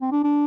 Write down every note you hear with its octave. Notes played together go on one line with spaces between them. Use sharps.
C4
D4
D4